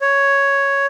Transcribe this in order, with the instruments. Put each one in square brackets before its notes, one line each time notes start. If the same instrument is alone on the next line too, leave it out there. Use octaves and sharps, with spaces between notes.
[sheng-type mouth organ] C#5